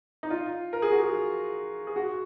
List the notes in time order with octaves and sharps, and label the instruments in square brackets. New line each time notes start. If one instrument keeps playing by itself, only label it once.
[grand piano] D#4
F4
A#4
G#4
F#4
G#4
G#4
F#4